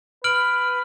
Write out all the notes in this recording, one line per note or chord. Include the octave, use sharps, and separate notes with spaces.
B4 F6 D7 F#7